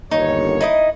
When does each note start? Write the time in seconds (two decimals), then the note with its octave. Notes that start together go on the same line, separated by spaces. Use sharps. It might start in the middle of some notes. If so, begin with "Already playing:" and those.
0.11 G1 D#2 D#4 C#5
0.61 D#4 E4 D#5